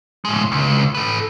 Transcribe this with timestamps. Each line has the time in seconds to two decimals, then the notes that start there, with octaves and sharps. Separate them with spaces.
0.25 A2 G#3
0.52 C#2
0.95 A4 B4